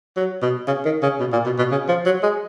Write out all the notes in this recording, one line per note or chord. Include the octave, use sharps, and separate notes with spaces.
F#3
B2
C#3
D#3
C#3
B2
A#2
B2
B2
C#3
F3
F#3
G#3